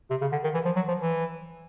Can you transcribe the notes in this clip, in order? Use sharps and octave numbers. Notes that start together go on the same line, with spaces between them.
C3
C#3
D3
D#3
E3
F3
F#3
F3
E3